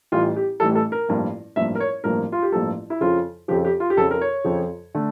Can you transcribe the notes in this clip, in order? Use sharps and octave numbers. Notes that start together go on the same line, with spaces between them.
A1 A2 E3 G3 F4
G4
A1 A2 E3 G3 A4
A4
A#4
A1 G2 F3 A#3
A1 G2 F3 A#3 E5
A#4
C#5
A1 G2 F3 A#3 A#4
F4
G4
A1 G2 F3 A#3 A4
E4
F2 C#3 F3 F4
F2 C#3 F3 G4
G4
F4
G4
F2 C#3 F3 A4
A#4
C#5
F2 C#3 F3
D3 A3